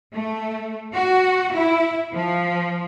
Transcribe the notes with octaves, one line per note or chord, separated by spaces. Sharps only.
A3
F#4
E4
F3